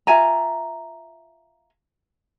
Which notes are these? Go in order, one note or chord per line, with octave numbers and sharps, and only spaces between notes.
F4 E5 G#5 A#5